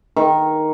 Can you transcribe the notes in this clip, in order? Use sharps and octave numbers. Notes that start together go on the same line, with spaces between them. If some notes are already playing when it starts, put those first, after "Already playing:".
D#3